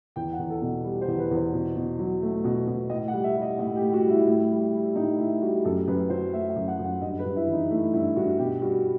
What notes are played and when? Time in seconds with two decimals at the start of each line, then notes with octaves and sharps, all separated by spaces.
0.16 E2 G5
0.33 F#5
0.39 E2
0.50 A4
0.62 B2
0.84 G3
1.01 C5
1.08 E2
1.19 B4
1.31 E2
1.36 C5
1.53 B2
1.76 B2
1.99 F#3
2.22 A3
2.44 B2
2.67 B2
2.90 A2 D#5
3.08 F#5
3.13 G3
3.24 E5
3.36 G3
3.42 D#5
3.59 A2 D#5
3.76 G4
3.82 A2
3.93 F#4
4.05 G3
4.10 E4
4.27 A2
4.50 G3
4.73 G3
4.96 A2 D#4
5.19 A2 E4
5.41 G3 F#4
5.65 F#2 A4
5.87 F#2 B4
6.10 F#3 C5
6.33 A3 E5
6.50 E5
6.56 F#2
6.68 F#5
6.79 F#2
6.84 F#5
7.02 G2 D#5
7.19 B4
7.25 G2
7.36 E4
7.47 E3
7.53 D#4
7.70 A3 E4
7.94 G2 E4
8.16 G2 F#4
8.39 B2 G4
8.62 G3 F#4